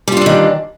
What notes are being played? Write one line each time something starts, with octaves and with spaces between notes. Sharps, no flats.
D#3 E3 G3 D4 F4